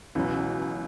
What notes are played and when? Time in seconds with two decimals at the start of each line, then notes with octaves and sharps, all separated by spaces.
0.15 C#2 B2 E3 F#3